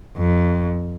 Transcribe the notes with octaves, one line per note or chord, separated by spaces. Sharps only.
F2